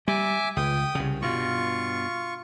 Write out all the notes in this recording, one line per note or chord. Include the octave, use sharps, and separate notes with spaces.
G3 E5 G#5 D6
C#2 G5 D#6
C2 C#3
G2 B2 F4 C#6